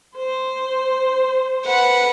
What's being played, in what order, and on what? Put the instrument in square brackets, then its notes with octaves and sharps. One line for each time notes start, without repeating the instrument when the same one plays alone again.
[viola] C5
[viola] B4 [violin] F#5